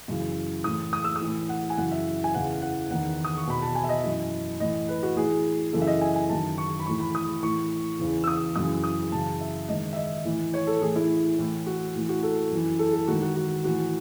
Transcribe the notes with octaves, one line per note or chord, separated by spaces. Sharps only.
F#2 C#3 E3
A2 E3 D#6
D#6
E6
D#6
A2 E3
F#5
G#5
F#2 C#3 E3 F#5
E5
G#5
E2 C#3 E3 F#5
F#5
E2 D#3 F#5
D#6
C#6
E2 B2 B5
A5
G#5
E5
D#5
F#2 E3
A2 E3 D#5
B4
F#4
A2 E3 G#4
F#2 C#3 E3 A4
E5
D#5
G#5
G#5
F#2 D#3 A5
C#6
B5
A2 E3 C#6
B5
D#6
A2 E3 C#6
E2 C#3 E3
E6
D#6
F#2 C#3 E3 D#6
D#6
F#2 C#3 E3 A5
E5
G#2 D#3 D#5
E5
D#5
A2 E3
C#5
A4
A2 E3 G#4
E4
A2 E3
F#4
A2 E3
F#4
A4
F#2 E3
A4
A4
G#2 D#3 F#4
F#4
F#4
A2 E3 F#4